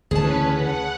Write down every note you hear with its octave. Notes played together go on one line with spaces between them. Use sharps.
D2 C#3 E3 C#4 G#4 B4 A5
F#5